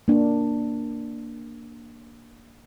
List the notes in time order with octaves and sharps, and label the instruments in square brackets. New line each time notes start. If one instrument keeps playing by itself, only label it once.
[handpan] A#3 D4